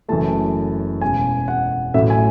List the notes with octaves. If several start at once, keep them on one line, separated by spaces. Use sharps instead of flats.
F#1 F#2 E3 A3 A5
E1 E2 C#3 G#5
F#5
A1 A2 F#3 A3 E5
G#5